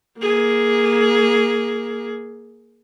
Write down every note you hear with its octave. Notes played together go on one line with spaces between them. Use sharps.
A#3 G#4